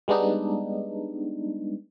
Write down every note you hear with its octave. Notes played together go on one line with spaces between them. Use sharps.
G3 G#3 B3 D4 D#4